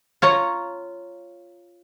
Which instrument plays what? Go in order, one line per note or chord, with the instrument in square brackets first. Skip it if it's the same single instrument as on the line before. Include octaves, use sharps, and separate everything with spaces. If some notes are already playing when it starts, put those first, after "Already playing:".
[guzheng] F4 C#5 A#5